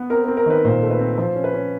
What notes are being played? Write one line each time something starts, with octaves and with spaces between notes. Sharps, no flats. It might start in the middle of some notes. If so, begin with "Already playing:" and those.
Already playing: B3
C4 A#4
A#4
C4
A#4
D#3 B4
A#2 C5
A3
B4
C4
F3 C5
C#4
B4
C#4